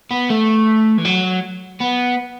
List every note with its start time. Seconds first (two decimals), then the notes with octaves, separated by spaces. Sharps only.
0.11 B3
0.30 A3
0.98 E3
1.05 F#3
1.81 B3